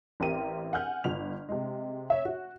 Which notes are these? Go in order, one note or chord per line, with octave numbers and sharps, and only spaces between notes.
A1 C4 G4 A#4 D#7
F#5 G#5 F6 G6
G1 F7
C3 G#3
C#5 E5
F#4